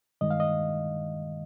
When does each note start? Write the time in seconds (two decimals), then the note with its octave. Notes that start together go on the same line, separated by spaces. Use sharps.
0.21 G2 D#3 G#3 D#5
0.31 F5
0.40 D#5